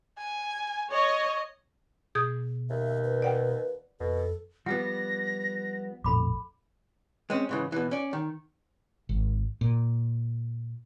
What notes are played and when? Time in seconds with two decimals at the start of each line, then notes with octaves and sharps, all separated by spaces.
0.18 G#5
0.92 C#5 D#5
2.15 B2 G#4 D#6 G6
2.70 D#2 E5
3.04 B4
3.22 D5 F#5 G5
4.00 F2 B2 A4
4.66 F3 G3 B3 F#5 A#6
6.04 A#1 F2 A2 A4 B5 D6
7.30 G#3 C4 C#4
7.49 G#2 C#3 E3
7.72 B2 E3
7.91 C#4 D5
8.13 D#3
9.09 G#1
9.61 A#2